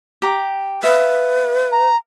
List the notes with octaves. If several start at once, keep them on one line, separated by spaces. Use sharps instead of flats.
G4 A#5 D6
B4 E5 F5
A#5